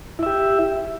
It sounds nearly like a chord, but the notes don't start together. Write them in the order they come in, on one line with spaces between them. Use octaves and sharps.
E4 E5 G4